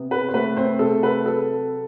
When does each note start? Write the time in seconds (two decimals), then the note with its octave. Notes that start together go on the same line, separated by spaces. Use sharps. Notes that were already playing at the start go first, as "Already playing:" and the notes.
Already playing: C3 B3
0.11 B4
0.29 C5
0.34 A3 B4
0.57 C4 C5
0.79 C3 A4
1.03 B4
1.25 F#3 A4